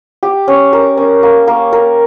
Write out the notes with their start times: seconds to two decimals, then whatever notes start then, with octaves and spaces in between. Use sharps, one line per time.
0.23 G4
0.48 C#4
0.73 A#4
0.97 C#4
1.23 A#3
1.48 A#3
1.73 A#4